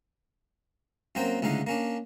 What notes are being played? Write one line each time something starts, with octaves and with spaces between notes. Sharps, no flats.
F#2 F#3 A#3 C4 C5 G5
C#2 A2 D3 D#4 F5
A#3 C#4 D4